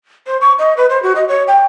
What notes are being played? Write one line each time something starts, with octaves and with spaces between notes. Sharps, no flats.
C5
C#6
D#5
B4
C5
F#4
D#5
C#5
G5